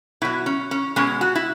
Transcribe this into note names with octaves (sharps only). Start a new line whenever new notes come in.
B2 F#3 E4
C#4
C#4
B2 G#3 C#4
F#4
E4